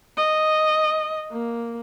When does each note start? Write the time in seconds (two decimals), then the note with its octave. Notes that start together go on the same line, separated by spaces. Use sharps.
0.17 D#5
1.32 A#3